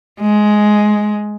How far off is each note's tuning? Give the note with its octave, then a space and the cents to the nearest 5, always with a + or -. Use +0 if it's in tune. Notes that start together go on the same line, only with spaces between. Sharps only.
G#3 +10